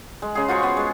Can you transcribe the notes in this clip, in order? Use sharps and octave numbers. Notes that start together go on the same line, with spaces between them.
G#3
C#3 G#4
F4 F#4 C5 C#6
B3
G#3